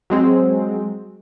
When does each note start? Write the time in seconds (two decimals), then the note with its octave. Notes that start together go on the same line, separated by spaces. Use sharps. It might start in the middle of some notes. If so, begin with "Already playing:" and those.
0.10 F#3 G#3 C4